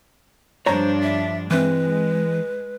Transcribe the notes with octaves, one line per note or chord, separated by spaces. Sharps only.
G2 F3 D4 C5 C#5 A#5
E5
E3 G#3 C4 B4